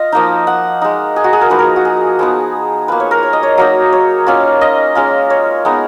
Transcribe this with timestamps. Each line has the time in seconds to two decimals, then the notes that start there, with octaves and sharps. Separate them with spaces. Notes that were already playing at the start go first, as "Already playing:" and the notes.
Already playing: F4 D#5 F5
0.12 F3 A#3 D#4
0.47 F#5
0.82 G#3 D#4
1.16 G#4
1.24 F#4
1.33 G#4
1.41 A#4
1.50 F3 A#3 D#4 B4
1.59 A#4
1.76 F#4
1.85 G#4
2.19 F3 B3 D#4 G#4
2.88 A#3 F4 B4
3.00 C#5
3.11 A#4
3.23 C#5
3.33 D#5
3.43 C#5
3.58 F#3 A#3 D#4
3.93 C#5
4.27 A#3 C#4 F4
4.61 D#5
4.95 G#3 C#4 F4
5.30 C#5
5.65 G#3 B3 D#4